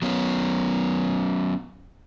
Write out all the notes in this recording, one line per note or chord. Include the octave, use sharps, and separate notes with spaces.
F#3 B3 C#4